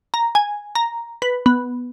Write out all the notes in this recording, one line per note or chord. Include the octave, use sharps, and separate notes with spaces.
A#5
G#5
A#5
B4
B3